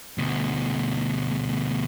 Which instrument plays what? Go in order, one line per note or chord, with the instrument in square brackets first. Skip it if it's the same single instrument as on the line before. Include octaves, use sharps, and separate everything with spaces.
[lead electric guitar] D2 B2